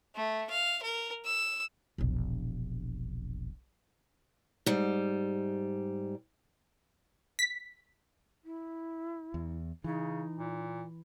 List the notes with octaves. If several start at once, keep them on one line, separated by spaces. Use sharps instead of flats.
A3
F5
A#4
E6
E1 A#1
G#2 G3
B6
E4
E2
C#3 E3 D#4
A#2